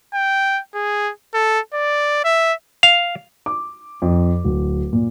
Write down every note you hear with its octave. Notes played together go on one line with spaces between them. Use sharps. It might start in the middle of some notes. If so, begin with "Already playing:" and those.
G5
G#4
A4
D5
E5
F5
D6
F2
D1
A#2